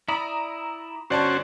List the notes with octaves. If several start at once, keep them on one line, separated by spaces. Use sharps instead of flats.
E4 D5 A#5 B5 D#6
G1 C#4 F#4 C5 D5 A5